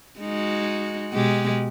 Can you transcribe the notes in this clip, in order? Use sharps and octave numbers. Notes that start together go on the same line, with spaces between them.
G#3 D#4 F#4
B2 G#3 G4